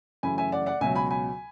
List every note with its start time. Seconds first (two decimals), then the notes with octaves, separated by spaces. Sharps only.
0.23 F#2 C#3 E3 A3 G#5 B5
0.38 E5 G#5
0.52 D5 F#5
0.66 D5 F#5
0.81 C#2 B2 F#3 E5 G#5
0.95 G#5 B5
1.11 G#5 B5